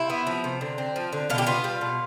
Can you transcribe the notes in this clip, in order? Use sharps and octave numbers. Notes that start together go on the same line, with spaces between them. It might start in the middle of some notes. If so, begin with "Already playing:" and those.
Already playing: C3 E4
B3
F3
C3
D3
C4
F3
D3
B2 F4
G4
B3 F4
G3
B2